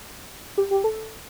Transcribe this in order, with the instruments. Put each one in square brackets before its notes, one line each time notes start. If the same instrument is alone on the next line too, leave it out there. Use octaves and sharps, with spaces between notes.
[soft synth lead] G4
G4
A4